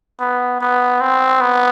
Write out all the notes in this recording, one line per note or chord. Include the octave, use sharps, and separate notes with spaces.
B3
B3
C4
B3